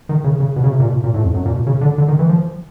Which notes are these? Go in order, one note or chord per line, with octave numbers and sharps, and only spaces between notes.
D#3
C#3
C#3
B2
C#3
C3
A#2
B2
A#2
A2
F2
F#2
A#2
B2
C#3
D3
D3
D#3
E3
F3